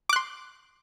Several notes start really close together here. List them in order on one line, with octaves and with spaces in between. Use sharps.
D6 F#6 C6